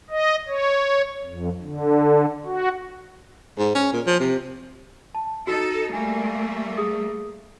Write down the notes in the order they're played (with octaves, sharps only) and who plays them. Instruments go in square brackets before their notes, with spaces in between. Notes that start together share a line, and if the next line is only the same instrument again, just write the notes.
[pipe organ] D#5
C#5
F2
D3
F#4
[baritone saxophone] G#2
C#4
A#2
F3
C3
[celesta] A5
[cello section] D#4 A4 [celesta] F#4 E6
[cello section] G3 A3 A#3 [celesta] G#5
[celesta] G#4 D#6